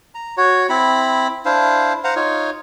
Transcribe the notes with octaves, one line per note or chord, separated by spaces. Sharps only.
A#5
F#4 C#5
C4 E4 B5
D4 E4 C5 F5
C5 F5 F#5 A#5
D#4 F4 C#5